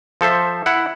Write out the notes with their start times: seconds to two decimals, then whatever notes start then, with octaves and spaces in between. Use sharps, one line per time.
0.21 F3 A4 C5 E5
0.66 E4 F#5